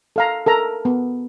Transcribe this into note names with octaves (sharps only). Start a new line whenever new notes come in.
A4 F5 A#5
A4 A#4 A#5
B3